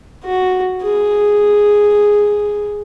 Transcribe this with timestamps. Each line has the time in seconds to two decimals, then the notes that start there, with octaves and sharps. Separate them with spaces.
0.25 F#4
0.83 G#4